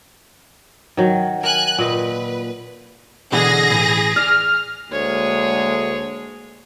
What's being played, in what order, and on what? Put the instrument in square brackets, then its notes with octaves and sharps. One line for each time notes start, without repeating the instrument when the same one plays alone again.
[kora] D#3 F#3
[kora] A#4 [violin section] G#5 F#6
[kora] A#2 D#5 [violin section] B4
[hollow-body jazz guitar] B2 D3 E3 [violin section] G#4 A#6
[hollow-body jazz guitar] A2 E3
[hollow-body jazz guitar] D5 [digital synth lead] F6
[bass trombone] D2 [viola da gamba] G#3 A#3 G#4 [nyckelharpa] C#5